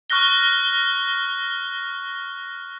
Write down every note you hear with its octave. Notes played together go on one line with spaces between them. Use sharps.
C#6 F6 F#6 A#6 G7